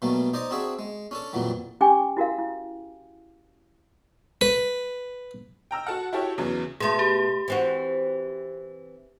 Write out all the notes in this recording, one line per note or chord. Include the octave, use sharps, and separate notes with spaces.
B2 F#3 G3 A3 A#3
D#4 C5 D5 D#5
C4 D4 F#4 G#4 E5
G#3
C#4 D4 A4
F2 A#2 E3 F#3 G3
C#4 G4 G5 G#5 D6
E4 F#4 A#4 F5
E4
B4
G5 A#5 E6
F#4 A4 F#5
E4 F#4 G4 A4 C#5 E5
E2 C#3 E3 F#3
B2 A3 G#4 C6
G4
E3 C4 F#4